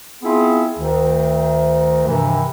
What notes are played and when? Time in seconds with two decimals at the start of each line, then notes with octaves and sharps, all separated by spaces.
0.23 B3 C4 E4 F4 G#4
0.77 D2 D#3
2.07 G2 C3 D#3 E3